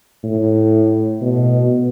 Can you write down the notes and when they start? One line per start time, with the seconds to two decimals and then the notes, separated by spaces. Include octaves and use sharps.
0.24 A2
1.21 B2